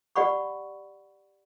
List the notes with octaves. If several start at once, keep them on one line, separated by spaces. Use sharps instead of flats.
G4 D5 F#5 B5 C#6